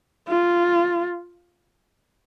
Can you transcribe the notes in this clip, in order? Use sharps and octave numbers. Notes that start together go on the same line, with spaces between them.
F4